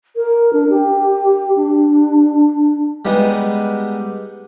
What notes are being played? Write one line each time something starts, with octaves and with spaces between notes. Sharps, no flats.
A#4
D4
G4
D4
G3 G#3 B3 D#4